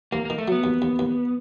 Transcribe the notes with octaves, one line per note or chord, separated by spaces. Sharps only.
D#2 A#3
A#3
D#3
A3
F#3 B3
D#2
D#2
D#2